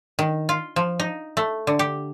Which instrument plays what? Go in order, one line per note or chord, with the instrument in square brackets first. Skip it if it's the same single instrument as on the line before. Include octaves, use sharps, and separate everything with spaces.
[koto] D#3
F4
F3
D#4
A3
D3
G4